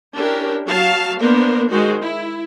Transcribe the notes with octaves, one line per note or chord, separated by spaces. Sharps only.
C#4 D4 E4 G4 A#4
F#3 F5 A5
A#3 B3 D4 A#4 C5
D#3 G#3 F#4 C5
E4